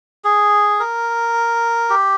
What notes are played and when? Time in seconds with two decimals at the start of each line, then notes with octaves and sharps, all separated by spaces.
0.24 G#4
0.80 A#4
1.90 G4